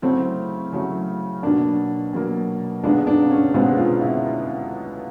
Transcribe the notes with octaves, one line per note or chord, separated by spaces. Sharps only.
C#3 F#3 A3 C4 C#4 E4
C#3 F#3 A3 C#4 E4
B2 F#3 A#3 D4
B2 F#3 A#3
C#2 B2 G#3 B3 D4
D4
C#4
C#2 B2 G#3 B3 C4
F4
E4